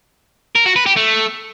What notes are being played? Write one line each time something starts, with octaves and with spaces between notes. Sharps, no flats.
A#4
F#4
B4
G4
A3